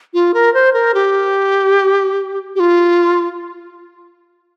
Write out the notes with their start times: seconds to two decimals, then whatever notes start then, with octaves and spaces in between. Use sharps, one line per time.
0.14 F4
0.34 A#4
0.54 C5
0.74 A#4
0.94 G4
2.55 G4
2.60 F4